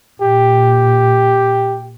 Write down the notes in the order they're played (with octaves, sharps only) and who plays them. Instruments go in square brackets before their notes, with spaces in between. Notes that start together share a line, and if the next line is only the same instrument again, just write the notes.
[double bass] A#2 [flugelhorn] G4